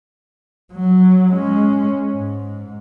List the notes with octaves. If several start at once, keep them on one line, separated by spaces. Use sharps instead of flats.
F#3
G#3 C#4
G#2